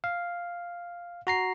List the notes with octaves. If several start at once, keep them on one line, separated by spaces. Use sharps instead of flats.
F5
F#4 A#5 C7